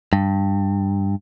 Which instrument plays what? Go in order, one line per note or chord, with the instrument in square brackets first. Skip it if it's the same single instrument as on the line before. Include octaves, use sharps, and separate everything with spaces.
[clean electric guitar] G2